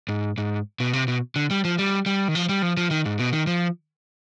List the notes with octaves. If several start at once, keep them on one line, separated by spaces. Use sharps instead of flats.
G#2
G#2
B2
C3
B2
D3
G3
F3
G3
G3
D#3
F3
G3
F3
F3
D#3
G#2
B2
D#3
F3